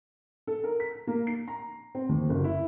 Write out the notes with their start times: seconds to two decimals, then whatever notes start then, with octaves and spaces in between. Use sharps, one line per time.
0.47 A4
0.64 A#4
0.80 B6
1.07 A#3
1.27 C7
1.48 A#5
1.95 C4
2.09 D#2
2.29 F#1
2.44 E4